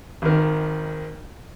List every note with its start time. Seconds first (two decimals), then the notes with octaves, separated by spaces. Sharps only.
0.22 G#1 D#3